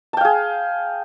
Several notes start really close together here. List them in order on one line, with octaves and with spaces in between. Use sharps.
A5 G5 F5 G#4